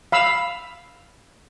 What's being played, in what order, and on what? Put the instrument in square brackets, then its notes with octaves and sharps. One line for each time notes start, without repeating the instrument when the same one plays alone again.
[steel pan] F5 B5 E6